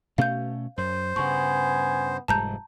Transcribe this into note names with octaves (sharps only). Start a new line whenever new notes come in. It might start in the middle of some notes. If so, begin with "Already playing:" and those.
B2 A3 C#4 F5 G6
F#2 C5
G2 C#3 B3 G#5 C#6
F1 G#2 G3 A5 A#5 G6